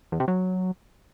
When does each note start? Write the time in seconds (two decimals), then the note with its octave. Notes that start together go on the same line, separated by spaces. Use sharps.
0.12 E2
0.20 C3
0.28 F#3